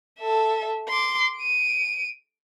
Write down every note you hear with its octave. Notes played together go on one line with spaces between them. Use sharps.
A4 E5
C6 D6
D7 D#7